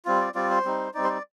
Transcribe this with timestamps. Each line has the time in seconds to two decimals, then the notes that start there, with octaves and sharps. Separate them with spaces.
0.05 G3 C4 F4
0.21 D5
0.35 G3 C4 F4 D5
0.50 C5
0.65 G3 C4 D#4
0.94 G3 C4 D#4 D5
1.04 C5
1.09 D5